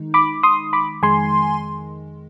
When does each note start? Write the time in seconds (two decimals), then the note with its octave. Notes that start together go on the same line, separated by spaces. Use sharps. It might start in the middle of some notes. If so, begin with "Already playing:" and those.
Already playing: D#3 G#3 D#4
0.14 B5 D6
0.43 C6 D#6
0.73 B5 D6
1.02 F2 D#3 G#3 G#5 C6